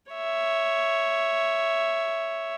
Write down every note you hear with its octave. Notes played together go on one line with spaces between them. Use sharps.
C#5 E5